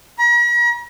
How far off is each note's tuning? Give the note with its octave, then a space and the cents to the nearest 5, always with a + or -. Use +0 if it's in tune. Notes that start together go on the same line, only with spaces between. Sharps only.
A#5 +45